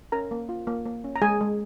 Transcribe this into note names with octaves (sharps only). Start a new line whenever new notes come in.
C#4 A#4 A#5
A#3
F4
A#3
A#3
C#4
A#5
G#3 G#4 G#5
G#3